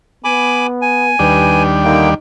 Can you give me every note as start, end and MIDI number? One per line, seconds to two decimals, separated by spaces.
0.24 1.15 59
0.24 0.67 80
0.24 0.67 83
0.24 0.67 86
0.82 1.63 80
1.19 2.14 39
1.19 2.14 55
1.19 2.14 62
1.19 1.66 71
1.85 2.09 50
1.85 2.09 58
1.85 2.15 63
1.85 2.09 79